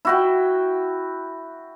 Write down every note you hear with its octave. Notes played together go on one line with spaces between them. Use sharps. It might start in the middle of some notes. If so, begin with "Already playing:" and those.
E4 F#4 G5